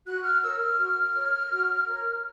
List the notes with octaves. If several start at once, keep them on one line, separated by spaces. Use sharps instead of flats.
F#4 F#6
F6
A#4 C#5 E6
F6
F#4
A#4 C#5
F#4
A#4 C#5